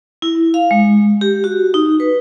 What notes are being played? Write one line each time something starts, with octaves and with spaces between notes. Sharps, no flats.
E4
F5
G#3
G4
F#4
D#4
B4